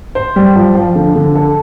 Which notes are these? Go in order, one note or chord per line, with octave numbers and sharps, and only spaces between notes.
C5
G3
F3
F3
D3
D3
A4